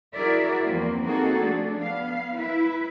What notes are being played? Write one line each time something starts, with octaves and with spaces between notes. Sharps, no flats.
E4 F#4 G#4 A#4 D5 E5
E2 F3 A#3 C4
A#3 C4 D#4 F#4 G#4 A4
F3 A3 D4
B3 F5
E4 B4 E5